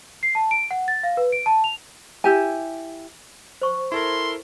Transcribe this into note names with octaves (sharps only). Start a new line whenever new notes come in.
C7
A5
D7
F#5
A6
F5
B4
D7
A5
F7
E4 G4 G#5
C5 C#6
E4 A4 A#4 C6